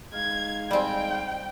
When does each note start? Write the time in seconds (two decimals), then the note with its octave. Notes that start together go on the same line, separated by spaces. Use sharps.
0.13 G#3 D#4 F5 G#6
0.71 G3 C4 D5 D#5 G5 G#5